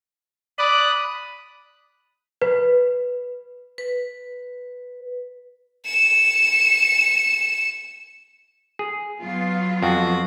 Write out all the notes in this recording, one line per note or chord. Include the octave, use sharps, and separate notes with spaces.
D5 B5 D#6 F#6
B4
B4
C#7 E7
G#4
F#3 B3 F4
F2 F#4